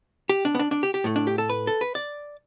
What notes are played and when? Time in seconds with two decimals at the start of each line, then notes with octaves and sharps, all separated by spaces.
0.29 G4
0.45 D4
0.55 B3
0.59 D4
0.71 D4
0.83 G4
0.94 G4
1.04 A2 A3
1.16 D4
1.27 G4
1.38 A4
1.50 B4
1.67 A4
1.81 B4
1.95 D5